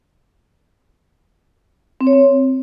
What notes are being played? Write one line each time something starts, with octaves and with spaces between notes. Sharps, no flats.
C4
C#5
C4